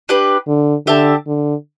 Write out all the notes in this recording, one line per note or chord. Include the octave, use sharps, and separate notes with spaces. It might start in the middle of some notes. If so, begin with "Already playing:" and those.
D4 G4 B4
D3
D3 G4 E5 A5
D3